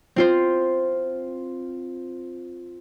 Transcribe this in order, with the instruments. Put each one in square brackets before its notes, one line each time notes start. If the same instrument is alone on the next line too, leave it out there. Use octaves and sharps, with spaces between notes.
[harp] C4 F4 C5